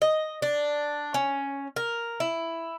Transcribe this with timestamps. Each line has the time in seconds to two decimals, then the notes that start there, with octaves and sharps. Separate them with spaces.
0.02 D#5
0.42 D4
1.14 C#4
1.76 A#4
2.20 E4